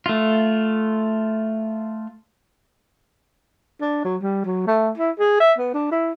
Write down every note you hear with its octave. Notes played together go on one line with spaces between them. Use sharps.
A3 F4
D4
F#3
G3
F#3
A3
E4
G#4
E5
B3
D4
E4